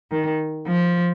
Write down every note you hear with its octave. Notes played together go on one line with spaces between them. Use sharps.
D#3
F3